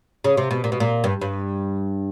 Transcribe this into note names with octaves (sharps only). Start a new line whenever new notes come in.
C#3
C3
B2
A#2
B2
A#2
G2
G2